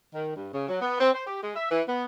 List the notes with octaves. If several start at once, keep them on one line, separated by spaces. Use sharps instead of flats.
D#3
G2
C#3
F#3
B3
C4
C5
G4
G#3
E5
E3
B3